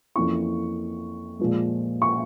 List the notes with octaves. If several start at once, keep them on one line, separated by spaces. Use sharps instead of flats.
F2 E3 A#3 C#4 E4 C#6
A#2 F3 G#3
C#6